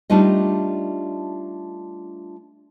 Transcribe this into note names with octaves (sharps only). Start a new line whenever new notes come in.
G3 A3 D4 D#4 F4 D#5